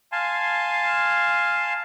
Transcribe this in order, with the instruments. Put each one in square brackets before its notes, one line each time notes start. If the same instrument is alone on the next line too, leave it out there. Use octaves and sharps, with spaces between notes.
[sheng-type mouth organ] F5 G#5 A5 C6